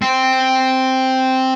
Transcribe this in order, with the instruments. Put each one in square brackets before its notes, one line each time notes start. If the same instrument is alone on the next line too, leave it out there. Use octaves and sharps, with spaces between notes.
[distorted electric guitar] C4